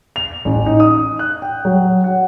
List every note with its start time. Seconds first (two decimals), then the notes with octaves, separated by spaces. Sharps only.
0.16 F7
0.45 A1
0.66 D#4
0.80 D#6
1.19 F#6
1.42 G5
1.65 F#3
2.04 F#5